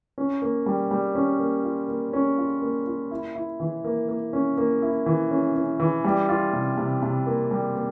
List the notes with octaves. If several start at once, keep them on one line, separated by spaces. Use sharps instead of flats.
C#4
A#3
G3
G3
C#4
A#3
F4
A#3
C#4
F4
A#3
F4
E4
E4
E3
A#3
A#3
C#4
A#3
E4
E3
C#4
C#4
E3
G3
F4
C3
C3
C3
A#3
G3
A#3